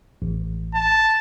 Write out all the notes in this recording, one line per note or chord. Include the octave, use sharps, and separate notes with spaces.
A1
A5